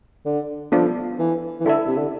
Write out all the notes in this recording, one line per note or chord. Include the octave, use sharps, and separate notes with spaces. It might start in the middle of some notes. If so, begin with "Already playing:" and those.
D3
F3 B3 D4 A4
E3
E3
D3 E4 A4 E5
C3
D3